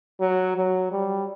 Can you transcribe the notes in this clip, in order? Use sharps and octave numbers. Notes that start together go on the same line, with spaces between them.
F#3
F#3
G3